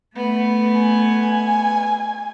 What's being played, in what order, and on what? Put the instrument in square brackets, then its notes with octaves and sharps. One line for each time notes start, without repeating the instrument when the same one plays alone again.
[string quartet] A3 B3
[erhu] G#5